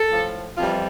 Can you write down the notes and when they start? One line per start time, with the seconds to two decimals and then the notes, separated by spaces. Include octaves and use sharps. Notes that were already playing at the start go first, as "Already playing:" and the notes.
Already playing: A4
0.09 A2 F3
0.57 F2 E3 G3 F4